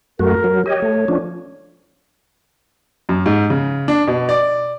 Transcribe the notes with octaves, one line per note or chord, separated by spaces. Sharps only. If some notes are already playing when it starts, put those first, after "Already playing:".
F#2 A3 F#4 A#4
F#3
G4 C#5 D#5
A3
F3 C#4 D4
F#2
G#2
C#3
D4
B2
D5